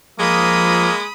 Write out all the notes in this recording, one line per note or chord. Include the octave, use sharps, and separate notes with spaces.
F3 G#3 A#3 B5 D#6